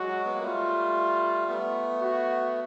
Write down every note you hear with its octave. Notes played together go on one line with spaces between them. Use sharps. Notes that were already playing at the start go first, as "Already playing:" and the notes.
Already playing: F#3 G#3 F#4
B3
A#3
G3 A3 F4
A3 B3
F#4